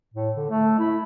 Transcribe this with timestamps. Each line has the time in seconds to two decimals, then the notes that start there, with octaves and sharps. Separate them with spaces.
0.14 A2
0.36 D3
0.50 A3
0.79 E4